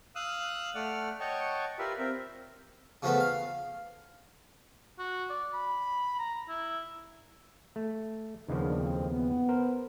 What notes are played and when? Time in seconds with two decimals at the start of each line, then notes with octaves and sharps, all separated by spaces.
0.15 F5 D#6 E6 F#6
0.75 A3 D5 F#5 F6
1.20 C#5 D#5 F#5 G5 A5 C#6
1.79 F4 G4 A#4 B4 D5 E5
1.99 C4 A#4 E5
3.02 C#3 F3 A3 B3
3.20 F5
4.99 F#4
5.30 D5
5.53 B5
6.19 A#5
6.49 E4
7.76 A3
8.49 D#2 C#3 F3 A#3 B3 D4
8.78 F2 E3 C4
9.10 B3
9.49 A#4 C5